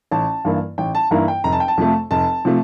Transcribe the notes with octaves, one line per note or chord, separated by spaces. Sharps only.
A1 A5
G2 E3 A#3 E4
A1 G5
A5
G2 E3 A#3 E4 A#5
G5
F1 A#5
A5
G5
A5
F2 C3 F3 A3
F1 A5
C3 F3 A3